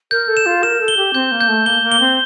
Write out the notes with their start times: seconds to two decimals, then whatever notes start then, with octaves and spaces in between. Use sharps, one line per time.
0.11 A#4 G6
0.28 A4
0.37 E7
0.46 F4
0.63 A#4 E7
0.80 A4
0.88 G7
0.97 G4
1.14 C4 G6
1.32 A#3
1.41 G6
1.48 A3
1.66 A#3 G7
1.82 A#3
1.92 G7
2.00 C4